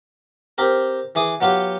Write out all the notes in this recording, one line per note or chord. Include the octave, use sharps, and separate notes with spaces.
C4 G4 A#4
E3 G#4 D6 D#6
F#3 B3 F4 G4